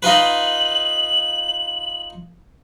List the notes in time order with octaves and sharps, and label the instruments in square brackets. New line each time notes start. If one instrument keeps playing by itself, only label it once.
[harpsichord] D#4 F4 B4 [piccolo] F#7